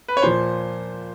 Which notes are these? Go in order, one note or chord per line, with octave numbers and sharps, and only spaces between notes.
B4
C#5
A#2 F3 C5